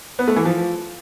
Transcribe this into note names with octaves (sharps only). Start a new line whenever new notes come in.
B3
A3
E3
F3